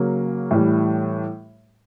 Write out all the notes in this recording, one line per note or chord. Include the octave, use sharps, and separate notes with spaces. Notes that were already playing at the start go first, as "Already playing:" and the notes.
Already playing: C#3 F#3 A#3
A2 E3 G3